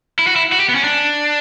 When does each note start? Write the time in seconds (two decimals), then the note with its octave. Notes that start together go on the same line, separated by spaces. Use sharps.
0.19 E4
0.27 F#4
0.36 E4
0.52 F#4
0.60 G4
0.68 B3
0.75 C#4
0.84 D4